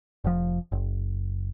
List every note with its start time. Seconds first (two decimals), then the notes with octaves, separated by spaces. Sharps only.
0.24 F1 F3
0.72 F#1